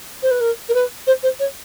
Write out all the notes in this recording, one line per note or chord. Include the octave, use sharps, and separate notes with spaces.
C5
B4
A#4
A#4
B4
C5
C5
C#5